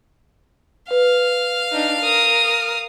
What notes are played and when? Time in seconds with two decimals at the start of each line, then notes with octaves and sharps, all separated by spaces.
0.91 B4 F5
1.72 D4 D#4
2.01 A#4 D#6